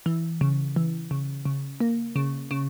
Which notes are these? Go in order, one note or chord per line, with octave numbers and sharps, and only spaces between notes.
E3
C#3
E3
C#3
C#3
A#3
C#3
C#3